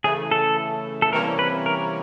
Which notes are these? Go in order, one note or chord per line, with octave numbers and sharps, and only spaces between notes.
C#3 E3 A3 G#4
A4
A4
C3 E3 G3 A#3 C#4 A#4
B4
A#4